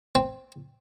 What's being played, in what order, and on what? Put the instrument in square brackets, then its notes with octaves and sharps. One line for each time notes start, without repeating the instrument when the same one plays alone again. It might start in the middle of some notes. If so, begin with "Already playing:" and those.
[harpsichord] C4